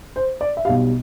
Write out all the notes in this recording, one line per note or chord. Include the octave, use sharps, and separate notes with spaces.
C5
D5
E5
B1 B2 G3 F5